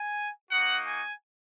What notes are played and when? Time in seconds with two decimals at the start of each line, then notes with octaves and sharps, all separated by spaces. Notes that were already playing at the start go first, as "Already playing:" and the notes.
Already playing: G#5
0.51 A#3 D#4 F#4 F#5
0.87 G#5